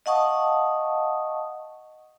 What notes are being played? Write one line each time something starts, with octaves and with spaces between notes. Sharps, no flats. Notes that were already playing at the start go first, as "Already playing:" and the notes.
D#5 F5 F#5 A5 C#6 D#6